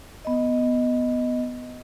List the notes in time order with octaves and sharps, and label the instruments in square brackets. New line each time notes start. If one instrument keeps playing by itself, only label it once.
[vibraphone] B3 D#5